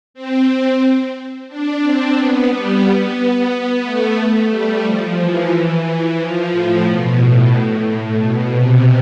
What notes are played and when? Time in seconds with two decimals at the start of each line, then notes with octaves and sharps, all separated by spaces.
0.14 C4
1.48 D4
1.82 C4
2.15 B3
2.49 G3
2.82 B3
3.16 B3
3.82 A3
4.17 A3
4.49 G3
4.83 F3
5.18 E3
5.84 E3
6.18 F3
6.51 A2
6.85 B2
7.18 A2
8.18 B2
8.52 C3